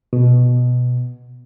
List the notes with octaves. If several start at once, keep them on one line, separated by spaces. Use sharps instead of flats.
B2